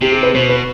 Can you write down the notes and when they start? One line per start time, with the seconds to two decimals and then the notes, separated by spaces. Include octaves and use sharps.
0.01 C3 G4
0.12 G#4
0.23 B4
0.34 B2 C5
0.49 B4